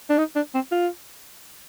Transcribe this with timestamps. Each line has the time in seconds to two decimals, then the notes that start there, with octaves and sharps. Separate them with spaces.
0.10 D4
0.18 D#4
0.35 D4
0.54 C4
0.71 F4